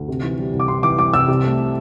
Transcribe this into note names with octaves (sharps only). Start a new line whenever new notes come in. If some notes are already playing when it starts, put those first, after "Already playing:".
Already playing: D2
C3
E3
G3
C2
D6
C3 C6
E3 D6
G3 D6
C2 E6
C3
A3